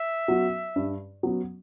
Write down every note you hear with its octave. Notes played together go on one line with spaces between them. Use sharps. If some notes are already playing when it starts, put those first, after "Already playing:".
Already playing: E5
F#3 B3 F#4
G2
F#3 B3 F#4